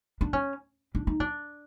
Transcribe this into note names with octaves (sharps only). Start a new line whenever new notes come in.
D4
C#4
D4
D#4
D4